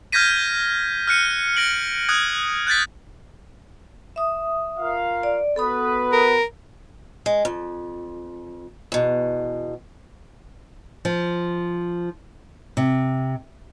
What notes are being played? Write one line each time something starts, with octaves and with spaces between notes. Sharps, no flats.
F6 G6 G#6 A#6 B6 D#7
F6 F#6 C#7 D#7
A#6 C#7 D7 F#7
D#6 F#6 G#6
F#6 G6 A6 B6
E5 D#6
F4 A#4 F5
D5
B3 F#4 A4 B4 B5 D#6
A#4
G#3
F2
E2 B2
F3
C3